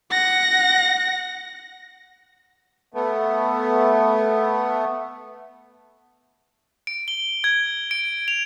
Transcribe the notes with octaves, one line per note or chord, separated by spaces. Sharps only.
F#5 A#6
A3 B3
D7
G7
G#6
D7
F7